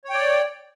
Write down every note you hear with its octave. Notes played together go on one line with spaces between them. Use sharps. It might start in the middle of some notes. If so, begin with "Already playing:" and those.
C#5 D5 G5